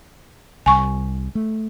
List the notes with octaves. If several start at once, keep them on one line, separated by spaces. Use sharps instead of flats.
C2 G3 G#5 C#6
A3